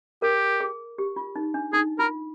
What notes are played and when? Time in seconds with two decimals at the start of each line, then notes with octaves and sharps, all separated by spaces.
0.22 G4 A#4
0.60 G#4
0.98 G4
1.16 F4
1.36 D#4
1.54 D4
1.73 D#4 G#4
1.99 F4 A#4